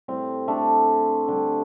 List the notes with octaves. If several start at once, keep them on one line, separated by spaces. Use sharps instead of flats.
A2 G3 C4
A3 D4
D3 G3